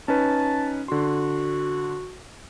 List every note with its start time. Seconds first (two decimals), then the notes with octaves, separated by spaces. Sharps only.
0.08 C#4 D#4 B4 A5
0.88 D3 F#4 C6